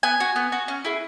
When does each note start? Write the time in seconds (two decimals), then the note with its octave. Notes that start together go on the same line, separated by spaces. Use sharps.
0.03 B3 G#5
0.20 F#4
0.36 B3
0.52 F#4
0.68 C#4
0.85 E4 G#4